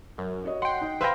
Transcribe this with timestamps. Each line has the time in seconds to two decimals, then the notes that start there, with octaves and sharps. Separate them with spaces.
0.18 F#2
0.44 F#4 C#5 D#5
0.62 F#5 G5 C6
0.81 D#4
1.01 B4 C5 E5 F5 G5 B5 G6 A#6